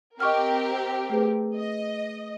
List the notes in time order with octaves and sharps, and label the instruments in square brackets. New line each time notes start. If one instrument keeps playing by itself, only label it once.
[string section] C4 G4 A#4 [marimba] D#5 C#6 F6
[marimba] A3 G#4 B4
[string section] D#5